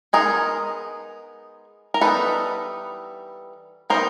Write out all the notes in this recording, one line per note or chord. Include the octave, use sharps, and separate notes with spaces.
G#3 B3 D#4 G#4 A#4
A#4
E3 G3 B3 D#4 A4 B4
D#3 G3 B3 D#4 A#4 C5